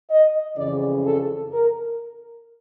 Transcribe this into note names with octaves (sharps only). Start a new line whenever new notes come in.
D#5
F2 C#3 E3 D5
A4
A#4